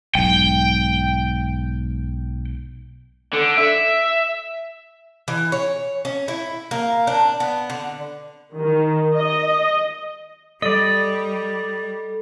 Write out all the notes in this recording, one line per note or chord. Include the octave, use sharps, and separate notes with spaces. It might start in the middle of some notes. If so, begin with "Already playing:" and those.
B1 G#2 G5
D3
E5
E3
C#5
C#4
E4
A#3
D4
B3
D3
D#3
D#5
G3 A4 D5 D#5